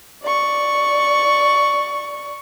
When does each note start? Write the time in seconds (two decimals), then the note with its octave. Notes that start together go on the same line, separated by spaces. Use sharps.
0.23 D5 C#6